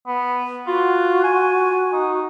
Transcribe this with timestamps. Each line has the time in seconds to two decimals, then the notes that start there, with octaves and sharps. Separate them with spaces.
0.07 B3
0.67 F4 F#4
1.24 G#5
1.93 D#4